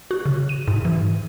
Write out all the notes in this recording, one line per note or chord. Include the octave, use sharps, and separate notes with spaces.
F#4
C#3
D#7
G#2
E3